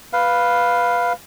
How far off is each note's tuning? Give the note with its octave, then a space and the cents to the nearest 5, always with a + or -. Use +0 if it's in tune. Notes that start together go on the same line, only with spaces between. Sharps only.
B4 +0 F5 +0